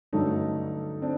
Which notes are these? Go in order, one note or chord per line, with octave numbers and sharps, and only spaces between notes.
G2 D3 F#3 A3 C#4 D#4
C4 D4